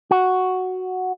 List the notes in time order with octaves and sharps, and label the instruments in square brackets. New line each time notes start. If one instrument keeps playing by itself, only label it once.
[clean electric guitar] F#4